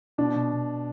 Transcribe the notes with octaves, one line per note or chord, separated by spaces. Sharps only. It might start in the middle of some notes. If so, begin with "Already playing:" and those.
B2 D4
B2
B2